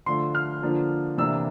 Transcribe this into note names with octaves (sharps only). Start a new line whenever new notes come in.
D3 F3 A3 D4 F4 C6
F6
D3 F3 A#3 D4 F4
C3 E3 A#3 D4 E6